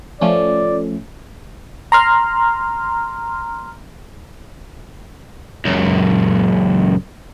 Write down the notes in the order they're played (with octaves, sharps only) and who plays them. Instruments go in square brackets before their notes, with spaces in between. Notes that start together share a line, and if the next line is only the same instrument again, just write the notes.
[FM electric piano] F3 A3 C#4 [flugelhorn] D5
[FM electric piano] A#5 C6 F6
[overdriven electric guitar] C#2 F#2